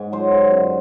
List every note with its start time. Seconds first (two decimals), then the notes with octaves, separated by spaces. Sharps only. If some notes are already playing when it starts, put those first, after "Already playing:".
Already playing: G#2
0.12 F#3 C5
0.32 D3
0.51 F#2